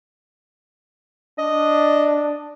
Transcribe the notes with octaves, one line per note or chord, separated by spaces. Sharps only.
D4 D#5